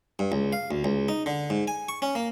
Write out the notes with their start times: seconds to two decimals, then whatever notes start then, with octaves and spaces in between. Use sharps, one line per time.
0.19 G2
0.32 C#2
0.53 F5
0.71 D2
0.84 C#2
1.08 D#4
1.26 D3
1.50 G#2
1.68 G#5
1.89 C#6
2.02 C#4
2.15 A#3